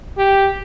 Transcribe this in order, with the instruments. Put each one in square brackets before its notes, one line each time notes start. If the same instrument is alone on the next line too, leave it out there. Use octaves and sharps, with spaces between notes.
[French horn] G4